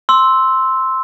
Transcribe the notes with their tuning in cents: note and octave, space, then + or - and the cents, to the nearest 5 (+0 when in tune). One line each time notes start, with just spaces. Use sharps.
C6 +0 E6 -10